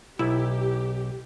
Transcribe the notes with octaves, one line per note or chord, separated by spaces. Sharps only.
B1 E4 G4